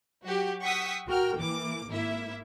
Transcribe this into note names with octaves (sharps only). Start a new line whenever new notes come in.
F#3 F#4 G4
F#5 G5 C#6 D#6 E6 B6
F#4 A#4 G5 F6
E3 A#3 D6
G#1 A#3 E4 E5